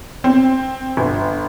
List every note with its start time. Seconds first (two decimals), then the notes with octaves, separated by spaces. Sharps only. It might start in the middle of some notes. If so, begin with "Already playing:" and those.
0.24 C4
0.97 G1